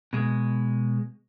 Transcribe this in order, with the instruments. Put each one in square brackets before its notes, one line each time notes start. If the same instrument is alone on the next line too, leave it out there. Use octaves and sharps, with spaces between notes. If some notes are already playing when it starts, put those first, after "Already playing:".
[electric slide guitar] B2 G#3